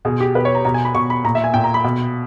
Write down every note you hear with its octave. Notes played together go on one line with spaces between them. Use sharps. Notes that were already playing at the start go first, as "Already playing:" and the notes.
B2 G#4
G4
B2 B4
C#5
A#5
B2 A#5
G#5
B5
B2 C#6
B5
A#2 A#5
E5
G#5
A#2 G5
A#5
B5
B2